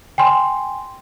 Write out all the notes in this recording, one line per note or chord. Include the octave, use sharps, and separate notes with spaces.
G5 G#5 C6